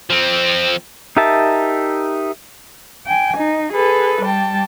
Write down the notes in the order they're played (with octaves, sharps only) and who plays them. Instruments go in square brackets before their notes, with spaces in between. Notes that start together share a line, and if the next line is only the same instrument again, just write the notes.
[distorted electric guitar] F3 C4
[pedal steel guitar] D#4 G4 A#4 E5 A5
[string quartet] G5 G#5
D#4
G#4 A4 B4
G3 G5 A5